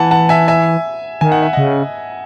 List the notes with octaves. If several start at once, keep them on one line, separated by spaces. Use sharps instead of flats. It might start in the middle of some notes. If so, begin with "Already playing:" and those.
Already playing: E3 F#5 G#5 A5 B5
F#5 A5
E5 G#5
E5 G#5
D#3 G#5
F#5
E5
C#3 D#5 F#5